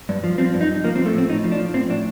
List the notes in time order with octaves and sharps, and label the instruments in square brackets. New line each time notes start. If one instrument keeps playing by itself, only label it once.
[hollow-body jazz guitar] G2
F3
F3 C4
G2
D#4
G2
F3 A#3
C4
F3
A3
A2 C4
A2 D#4
F3
D4
F3
A2 C4
A2 D4